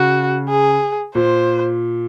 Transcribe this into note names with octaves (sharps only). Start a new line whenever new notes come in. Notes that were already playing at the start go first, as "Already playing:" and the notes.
Already playing: C#3 F#4
G#4
A#2 C5